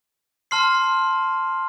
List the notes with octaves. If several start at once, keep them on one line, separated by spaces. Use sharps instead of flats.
A5 C6 F6 C7